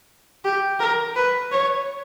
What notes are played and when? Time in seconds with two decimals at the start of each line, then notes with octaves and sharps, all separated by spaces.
0.45 G4
0.80 A#4
1.16 B4
1.52 C#5